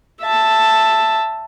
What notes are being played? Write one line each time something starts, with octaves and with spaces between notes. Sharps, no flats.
E5 A5